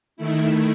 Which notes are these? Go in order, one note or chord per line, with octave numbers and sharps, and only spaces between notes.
D#3 A3 E4